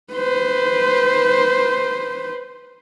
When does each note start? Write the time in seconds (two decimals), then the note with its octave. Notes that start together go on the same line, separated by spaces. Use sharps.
0.13 B4 C5